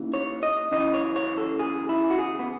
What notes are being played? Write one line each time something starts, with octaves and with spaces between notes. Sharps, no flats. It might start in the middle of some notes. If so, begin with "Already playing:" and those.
Already playing: D#2 C#3 E3
C#5
D#5
F#2 C#3 E3 D#5
C#5
C#5
A4
G#4
E4
F#4
G#4
B3